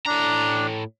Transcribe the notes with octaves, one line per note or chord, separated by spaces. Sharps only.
A2 D4 A#5